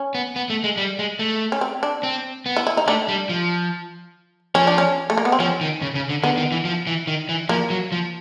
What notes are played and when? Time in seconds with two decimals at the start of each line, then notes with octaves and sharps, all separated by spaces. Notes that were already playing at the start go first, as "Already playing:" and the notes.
Already playing: C#4
0.15 B3
0.36 B3
0.50 A3
0.64 G#3
0.77 G3
0.99 G#3
1.19 A3
1.52 C#4
1.61 C4
1.83 D4
2.03 C4
2.46 B3
2.57 E4
2.67 E4
2.77 D#4
2.87 A3 D4
3.08 G3
3.29 F3
4.55 F3 C#4
4.67 D4
4.78 C#4
5.10 A3
5.18 A#3
5.25 B3
5.32 C4
5.40 F3 C#4
5.61 D#3
5.82 C#3
5.95 C#3
6.09 D3
6.23 D3 B3
6.37 D#3
6.52 E3
6.65 F3
6.87 E3
7.07 D#3
7.29 E3
7.49 F3 A#3
7.70 F#3
7.92 F3